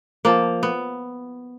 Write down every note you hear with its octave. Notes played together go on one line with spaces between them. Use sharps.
F3 A#3
B3